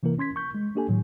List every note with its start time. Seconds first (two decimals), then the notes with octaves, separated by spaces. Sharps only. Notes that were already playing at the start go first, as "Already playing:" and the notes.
0.03 C3 E3 A#3 E4 A#4
0.18 C#4 C6 G#6 B6
0.36 C#6 G6
0.55 G#3
0.75 A#3 D4 G4 A4 G#5
0.89 A2 D#3 F#3